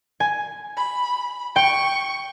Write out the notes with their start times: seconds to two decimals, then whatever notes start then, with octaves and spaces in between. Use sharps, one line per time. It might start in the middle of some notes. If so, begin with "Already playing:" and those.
0.20 G#5
0.77 B5
1.56 G5 C#6